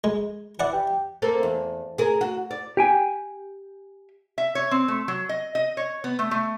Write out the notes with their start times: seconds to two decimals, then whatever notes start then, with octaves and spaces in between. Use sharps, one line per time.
0.04 G#3
0.60 E3 D5 F#5
0.73 G4
1.22 A#3 C4 A4
1.43 E2
1.98 G#4 A#4
2.21 F#4
2.51 D5
2.77 G4 G5 G#5
4.38 E5
4.55 C#5
4.71 C4
4.88 A3
5.08 F#3
5.29 D#5
5.55 D#5
5.77 C#5
6.04 B3
6.19 A3
6.31 A3